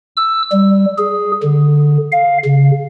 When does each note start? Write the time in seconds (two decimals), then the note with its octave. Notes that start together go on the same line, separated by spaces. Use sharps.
0.17 E6
0.52 G3
0.98 G#4
1.43 D3
2.12 F5
2.45 C#3